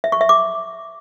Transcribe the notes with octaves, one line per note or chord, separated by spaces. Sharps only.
E5
C#6
E5
D6